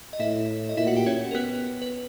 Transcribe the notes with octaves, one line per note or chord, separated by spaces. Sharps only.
D#5
A2 E4 E5
D#5
A#2 E4 E5
F#4 F#5
G4 G5
C#4 C#5
A#4
B3 B4
B4